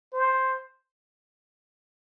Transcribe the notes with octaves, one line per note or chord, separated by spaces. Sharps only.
C5